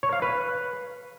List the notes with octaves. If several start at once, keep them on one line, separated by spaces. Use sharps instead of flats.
C#5
F5
B4